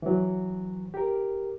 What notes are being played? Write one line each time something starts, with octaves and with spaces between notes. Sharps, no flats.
E3 F#3
G4 A#4